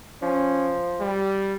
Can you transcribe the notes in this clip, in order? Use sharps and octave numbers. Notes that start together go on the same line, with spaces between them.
F3 C#4
G3